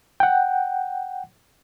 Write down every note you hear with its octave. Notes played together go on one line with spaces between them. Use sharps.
F#5 G5